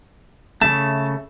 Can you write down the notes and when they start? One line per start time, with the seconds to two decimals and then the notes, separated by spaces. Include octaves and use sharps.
0.62 C#3 A3 A5